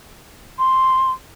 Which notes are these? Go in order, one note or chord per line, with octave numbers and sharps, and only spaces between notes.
C6